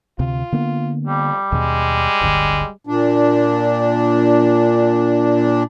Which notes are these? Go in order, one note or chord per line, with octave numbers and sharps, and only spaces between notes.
D2 C3 F4
D3 A#3 B3
F2 G3
D#2 B2 G#3
D1 G1 D3
A#2 D4